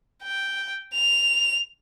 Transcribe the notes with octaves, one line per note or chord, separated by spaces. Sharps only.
G5
F7